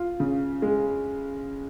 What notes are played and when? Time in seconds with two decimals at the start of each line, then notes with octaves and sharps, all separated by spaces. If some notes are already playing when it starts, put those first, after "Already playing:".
Already playing: F4
0.20 C#3
0.62 G#3